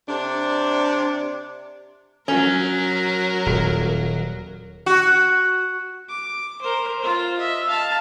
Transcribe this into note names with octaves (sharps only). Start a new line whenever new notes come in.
C3 D4
F#3 C#4 A#4
D#1
F#4
D6
A#4 C5
F4 C5
D#5 E5
F5 A5